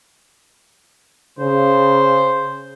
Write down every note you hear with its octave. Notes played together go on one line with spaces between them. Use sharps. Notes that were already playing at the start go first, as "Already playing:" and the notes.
C#3 C5